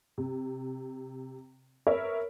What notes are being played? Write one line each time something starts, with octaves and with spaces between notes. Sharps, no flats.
C3
A#4 B4 C#5 E5